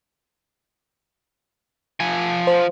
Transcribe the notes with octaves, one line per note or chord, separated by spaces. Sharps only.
F3 G#5
C5